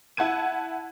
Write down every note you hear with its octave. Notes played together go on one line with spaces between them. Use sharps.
E4 F#5 A5 G#6 D#7